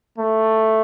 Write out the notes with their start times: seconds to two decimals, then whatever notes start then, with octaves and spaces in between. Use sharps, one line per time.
0.18 A3